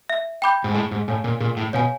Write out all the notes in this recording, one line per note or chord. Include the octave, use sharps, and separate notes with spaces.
E5
G5 B5 D6 G6
G#2
A2 G#4
G#2
A2 C#5 F5 G#5
A#2
A#2 G#4
A2
B2 C#5 F5 G#5